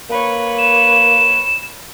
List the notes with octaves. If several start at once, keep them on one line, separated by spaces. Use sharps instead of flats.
A#3 B4 C#5
E7